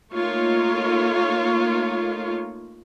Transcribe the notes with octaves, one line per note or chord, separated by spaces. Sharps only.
A3 A#3 D#4 F4 C#5